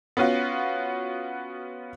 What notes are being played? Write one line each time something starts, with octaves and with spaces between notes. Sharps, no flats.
B3 C#4 F4 F#4